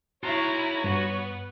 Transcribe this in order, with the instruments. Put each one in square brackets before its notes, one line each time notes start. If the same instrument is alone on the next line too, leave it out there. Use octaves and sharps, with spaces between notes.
[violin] E4 A#5 [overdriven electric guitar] F#4 C6 [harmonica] C#5
[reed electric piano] G2 [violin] B3